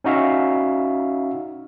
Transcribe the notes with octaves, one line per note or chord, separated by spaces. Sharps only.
C#4 D#4 F#4 E5 F5